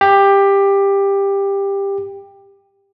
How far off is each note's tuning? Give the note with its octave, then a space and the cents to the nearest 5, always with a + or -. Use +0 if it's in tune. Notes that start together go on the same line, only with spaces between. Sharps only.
G4 +15